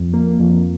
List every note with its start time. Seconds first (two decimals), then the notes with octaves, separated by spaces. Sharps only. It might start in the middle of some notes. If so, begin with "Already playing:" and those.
Already playing: F2
0.13 A#3
0.39 F2